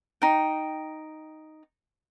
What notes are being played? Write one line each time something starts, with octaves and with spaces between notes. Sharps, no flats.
D#4 G5